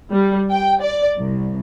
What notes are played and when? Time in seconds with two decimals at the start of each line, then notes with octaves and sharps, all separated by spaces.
0.12 G3
0.50 G5
0.81 D5
1.18 C2